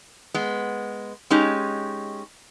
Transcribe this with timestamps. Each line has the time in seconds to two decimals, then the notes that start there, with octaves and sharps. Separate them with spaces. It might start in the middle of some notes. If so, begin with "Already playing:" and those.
0.34 G#3 B3
1.30 G#3 C#4 D#4 G4